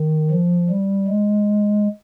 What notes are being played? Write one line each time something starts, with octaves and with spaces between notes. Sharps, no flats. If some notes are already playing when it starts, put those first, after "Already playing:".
Already playing: D#3
F3
G3
G#3